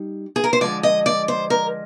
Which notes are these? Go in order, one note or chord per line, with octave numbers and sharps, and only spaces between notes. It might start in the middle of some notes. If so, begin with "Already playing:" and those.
Already playing: G3 D#4
G#4
A#4
C5
D3 F3 G#3 D5
D#5
D5
C5
A#4